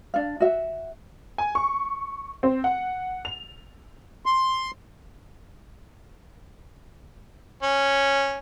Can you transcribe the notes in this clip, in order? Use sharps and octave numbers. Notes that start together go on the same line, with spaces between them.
D4 F5
F#4 E5
G#5
C#6
C4
F#5
F7
C6
C#4